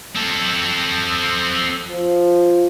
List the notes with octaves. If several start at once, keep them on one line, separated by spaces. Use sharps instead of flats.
C4 A4
F3